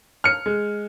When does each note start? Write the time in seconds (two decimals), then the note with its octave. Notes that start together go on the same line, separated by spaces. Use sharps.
0.24 F6 C#7
0.46 G#3